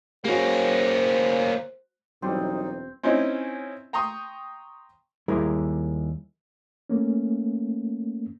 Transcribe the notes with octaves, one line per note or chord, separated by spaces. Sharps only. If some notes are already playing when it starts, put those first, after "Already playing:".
G#3 A#3 C#4 F#4 C5
E1 F#3 G3 C4 D#4
C4 C#4 D#4 E4
G5 A#5 C6 C#6 D#6
D#2 G3 G#3 E4 G#4 A#4
A3 A#3 C#4